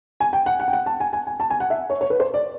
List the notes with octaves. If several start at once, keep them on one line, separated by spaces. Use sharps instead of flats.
G#5
G5
F#5
F#5
G5
F#5
A5
G#5
G#5
G#5
A5
G#5
F#5
E5
C#5
C#5
B4
C5
D5